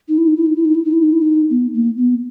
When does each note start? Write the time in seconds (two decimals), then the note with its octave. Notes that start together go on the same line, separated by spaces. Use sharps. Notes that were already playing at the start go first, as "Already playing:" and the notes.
0.09 D#4
0.18 E4
0.28 D#4
0.36 E4
0.46 D#4
0.56 E4
0.65 D#4
0.75 E4
0.84 D#4
0.93 E4
1.03 D#4
1.13 E4
1.22 D#4
1.50 B3
1.74 A#3
1.97 B3